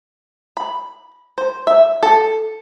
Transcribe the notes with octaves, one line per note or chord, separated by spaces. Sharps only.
B5
C5
E5
A4